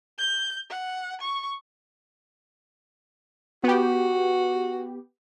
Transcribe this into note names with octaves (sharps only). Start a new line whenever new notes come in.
G6
F#5
C#6
B3 F#4 G4